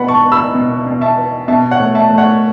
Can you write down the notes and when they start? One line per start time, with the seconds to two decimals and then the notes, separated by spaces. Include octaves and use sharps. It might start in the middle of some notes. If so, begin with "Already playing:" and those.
Already playing: B2 B3 F#5 B5
0.08 A5 C#6
0.24 B3
0.32 B5 E6
0.55 B2
0.86 B2
1.01 E5 A5
1.17 B3
1.48 B2 E5 A5
1.71 C#5 F#5
1.79 A3
1.95 E5 A5
2.10 A3
2.18 C#5 F#5